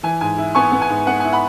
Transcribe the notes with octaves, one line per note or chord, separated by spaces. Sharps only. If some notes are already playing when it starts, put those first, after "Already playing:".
E3 G#5
G#2 G#5
E4
B3 G#5 C#6
B3
G#5
G#2
B3 F#5
G#5
E4
F#5 B5